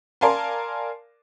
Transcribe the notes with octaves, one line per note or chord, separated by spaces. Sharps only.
A#4 D5 F5 G#5 A5 C6